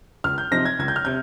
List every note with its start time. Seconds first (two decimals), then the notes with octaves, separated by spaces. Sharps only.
0.24 C#2 F6
0.38 G6
0.51 C3 F3 C4 D#4 A#6
0.65 G#6
0.79 C#2 G#6
0.88 G6
0.96 F6
1.05 C3 G6